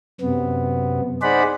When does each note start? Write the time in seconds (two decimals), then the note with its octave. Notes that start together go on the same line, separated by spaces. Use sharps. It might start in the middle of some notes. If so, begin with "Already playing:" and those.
0.21 F#2 C3 B3
1.22 D#4 G#4 C5 D5 F#5 B5